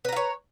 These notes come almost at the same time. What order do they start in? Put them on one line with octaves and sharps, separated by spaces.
B4 A#5 F5 C#5